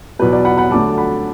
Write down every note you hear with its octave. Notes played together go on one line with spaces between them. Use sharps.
E2 B2 F#3 B4
D5
F#5 B5
F#5 B5
D2 D3 F#3 A5 D6
F#5 B5